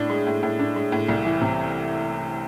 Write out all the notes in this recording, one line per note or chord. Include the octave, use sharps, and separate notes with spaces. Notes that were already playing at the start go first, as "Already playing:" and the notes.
Already playing: A2 D4
G#3
A2
A2
D4
G#3
A2
C2
E3
C3